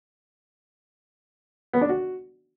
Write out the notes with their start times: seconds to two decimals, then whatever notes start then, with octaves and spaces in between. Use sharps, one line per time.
1.73 B3
1.81 D4
1.89 F#4